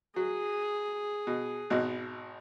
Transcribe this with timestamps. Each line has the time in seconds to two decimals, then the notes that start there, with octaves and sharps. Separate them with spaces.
0.16 F#3 G#4
1.27 B2
1.70 G#1 B2